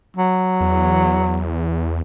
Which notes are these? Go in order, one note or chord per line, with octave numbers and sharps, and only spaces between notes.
F#3
E2